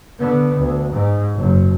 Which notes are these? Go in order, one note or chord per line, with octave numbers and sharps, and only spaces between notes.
D3 B3
D2
G#2
F#1 F#2